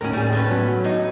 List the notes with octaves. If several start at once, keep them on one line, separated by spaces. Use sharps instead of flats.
D#2 A2 C#4 F#4 A#4
G3 G#4
A3 C#4 B4
F#3 B3 F#4
A2 D#4